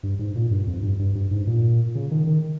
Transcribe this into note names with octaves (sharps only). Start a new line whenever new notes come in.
G2
G#2
A#2
G2
F2
G2
G2
G2
G#2
A#2
C#3
D#3
D#3